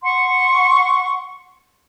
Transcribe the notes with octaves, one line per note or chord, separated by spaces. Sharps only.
F#5 C6 C#6